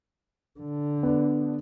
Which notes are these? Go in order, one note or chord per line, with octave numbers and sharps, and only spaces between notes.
D3
B3 D4